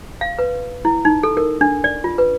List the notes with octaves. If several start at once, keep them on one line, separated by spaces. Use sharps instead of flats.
F5
B4
E4
D#4
A4
A#4
D4
D5
F4
B4